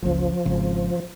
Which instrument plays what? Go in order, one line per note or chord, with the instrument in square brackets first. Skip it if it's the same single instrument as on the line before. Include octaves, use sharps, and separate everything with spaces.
[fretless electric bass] F#1 C#2 [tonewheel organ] F3
[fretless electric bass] G#1 C#3